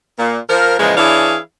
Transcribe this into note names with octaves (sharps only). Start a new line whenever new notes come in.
A#2
F3 A#4
A#2 C#3 E3 F3 G#3
E3 D4 E4 G#4 C#5 F5